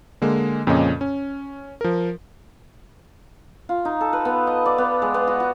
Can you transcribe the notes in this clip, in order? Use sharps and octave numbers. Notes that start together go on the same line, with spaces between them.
D3 G#3 A#3
F2 A#2 C#3 C#4 D#5
C#4
F3 A#4
F4
D#4
A4
B4
B3
D#5
D5
B3
G#3
B3
F#4
F#4